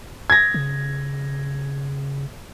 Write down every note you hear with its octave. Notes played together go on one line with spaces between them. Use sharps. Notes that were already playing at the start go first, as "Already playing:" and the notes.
G#6 A#6
C#3